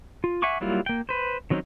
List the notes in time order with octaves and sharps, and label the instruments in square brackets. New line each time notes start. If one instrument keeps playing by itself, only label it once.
[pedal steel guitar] F4
E5 F#5 G#5 C#6 D6
F#3 G3 A#3 E4 F4
A#3 G5
B4 C5
D#3 F#3 C4 C#4 D#4